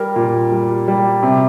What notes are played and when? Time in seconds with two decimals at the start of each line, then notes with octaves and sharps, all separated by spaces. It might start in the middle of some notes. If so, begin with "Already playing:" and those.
Already playing: G3 A#4
0.16 A#2
0.52 G3
0.88 G3
1.23 C3